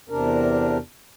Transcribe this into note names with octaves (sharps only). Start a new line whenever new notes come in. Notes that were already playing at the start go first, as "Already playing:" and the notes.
E2 C3 D4 A#4